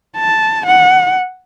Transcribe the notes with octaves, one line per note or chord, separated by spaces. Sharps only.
A5
F#5